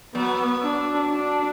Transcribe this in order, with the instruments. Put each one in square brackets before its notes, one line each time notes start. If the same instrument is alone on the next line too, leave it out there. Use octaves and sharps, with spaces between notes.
[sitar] F#3 [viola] B3
[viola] D4
D4